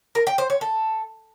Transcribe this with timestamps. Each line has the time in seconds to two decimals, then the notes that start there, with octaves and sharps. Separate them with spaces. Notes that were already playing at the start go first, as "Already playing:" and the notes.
0.15 A#4
0.27 G5
0.38 C5
0.50 C#5
0.61 A4